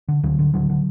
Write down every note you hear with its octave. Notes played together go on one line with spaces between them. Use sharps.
D3
D2 D3 F#3
D3
D2 D3 F#3
D3